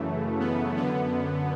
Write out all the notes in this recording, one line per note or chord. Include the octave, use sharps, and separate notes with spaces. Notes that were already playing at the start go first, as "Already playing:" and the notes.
Already playing: F#2 C#3 E3 A3
B3
F#2 D3 B3